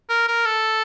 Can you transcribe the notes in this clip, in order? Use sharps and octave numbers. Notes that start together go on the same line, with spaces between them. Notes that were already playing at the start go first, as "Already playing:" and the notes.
A#4
A#4
A4